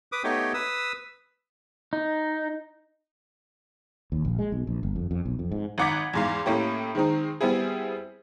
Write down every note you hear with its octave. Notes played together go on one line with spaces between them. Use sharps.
B4 D6 D#6
A3 B3 D#4 G4 C#5 G5
B4 D#6 E6
D#4
D#2
A#1
G#3
B1
A#1
G1
F2
F2
B1
F2
G#2
G#1 D#4 F#5 D6 G#6 B6
E2 G#2 F5
A2 A#3 C#4 E4 G4
D#3 G#3 C4 D#4
G3 B3 C4 E4 G#4